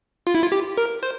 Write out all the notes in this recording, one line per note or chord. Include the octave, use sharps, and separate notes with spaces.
F4
E4
F4
G4
A#4
C5